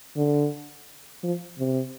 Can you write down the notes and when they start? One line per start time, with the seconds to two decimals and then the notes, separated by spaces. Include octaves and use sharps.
0.16 D3
1.23 F3
1.59 C3